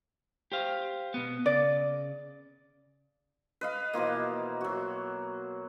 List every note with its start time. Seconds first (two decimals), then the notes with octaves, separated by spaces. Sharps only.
0.52 G4 C5 F5
1.14 B2 B3
1.46 C#3 D5
3.61 B4 D#5 F5
3.94 B2 E3 F3 A#3
4.61 F#3 F#4